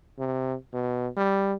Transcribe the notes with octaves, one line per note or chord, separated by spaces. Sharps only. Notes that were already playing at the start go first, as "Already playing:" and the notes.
C3
B2
G3